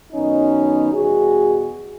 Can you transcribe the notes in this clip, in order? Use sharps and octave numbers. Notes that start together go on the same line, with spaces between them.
F#2 D#3 F#3 B3 C#4 D#4
E2 B2 G3 F#4 G#4